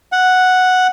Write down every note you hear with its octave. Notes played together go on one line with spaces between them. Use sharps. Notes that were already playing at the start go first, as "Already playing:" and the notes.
F#5